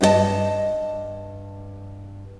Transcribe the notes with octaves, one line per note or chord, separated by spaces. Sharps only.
G2 D#4 F#4 D#5 A5